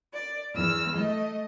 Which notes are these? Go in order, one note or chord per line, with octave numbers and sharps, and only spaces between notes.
D5
E2 E6 F6
A3 D#5